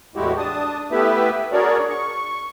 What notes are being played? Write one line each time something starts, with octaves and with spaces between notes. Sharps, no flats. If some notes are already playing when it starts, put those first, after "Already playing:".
E2 A2 G#3 E4 F#4 G4
D4 A5 D#6
A3 B3 E4 G4 B4 E5
D4 F#4 G#4 A#4 C#5 D5
C#6